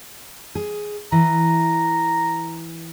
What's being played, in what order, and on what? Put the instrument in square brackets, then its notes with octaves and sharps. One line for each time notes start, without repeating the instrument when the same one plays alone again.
[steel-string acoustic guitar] G#4
[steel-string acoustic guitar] E3 [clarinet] A#5